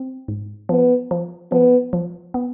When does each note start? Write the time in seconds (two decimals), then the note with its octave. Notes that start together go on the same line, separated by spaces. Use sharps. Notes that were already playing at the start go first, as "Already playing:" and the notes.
Already playing: C4
0.28 G#2
0.69 F3 B3
1.11 F3
1.52 F3 B3
1.93 F3
2.34 B3